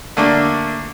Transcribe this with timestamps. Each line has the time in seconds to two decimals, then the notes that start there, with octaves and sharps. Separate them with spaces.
0.17 D3 A3 A#3 D4